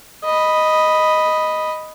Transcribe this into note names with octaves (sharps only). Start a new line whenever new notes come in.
D#5 B5